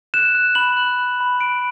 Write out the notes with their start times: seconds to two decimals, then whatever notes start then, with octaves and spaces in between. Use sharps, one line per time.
0.14 F#6 E7
0.35 F#6
0.55 B5 F#7
0.77 F#6
0.99 F#6
1.20 B5
1.41 F#6 D7